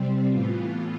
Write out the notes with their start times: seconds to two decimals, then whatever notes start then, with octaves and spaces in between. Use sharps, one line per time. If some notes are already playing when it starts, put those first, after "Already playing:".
Already playing: C3 G3 C4
0.29 A2 E3 B3 F4